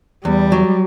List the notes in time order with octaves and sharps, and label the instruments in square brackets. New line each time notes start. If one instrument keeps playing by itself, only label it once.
[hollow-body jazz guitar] E2 [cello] G3
[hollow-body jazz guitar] F#3